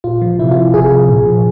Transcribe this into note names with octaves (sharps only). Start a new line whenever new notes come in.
A#2 F4
F3
C3 E4
F4
F3
C3 G#4
F3
A#2
F3